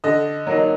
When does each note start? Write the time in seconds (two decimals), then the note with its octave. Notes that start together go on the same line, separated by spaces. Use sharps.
0.04 D3 D#5
0.47 F#3 A#3 D#4